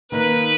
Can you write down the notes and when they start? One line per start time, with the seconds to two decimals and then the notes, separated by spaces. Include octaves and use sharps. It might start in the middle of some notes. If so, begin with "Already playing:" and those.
0.11 D#3 A#3 D#4 B4